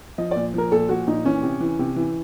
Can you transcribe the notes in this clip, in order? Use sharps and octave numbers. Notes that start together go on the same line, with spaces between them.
F3 D#5
A#2 D5
F3 A#4
A#2 A4
F3 F#4
A#2 D#4
E3 C#4
C3
E3
C3
E3